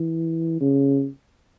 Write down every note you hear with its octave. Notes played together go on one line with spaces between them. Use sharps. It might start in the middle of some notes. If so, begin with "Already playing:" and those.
Already playing: E3
C#3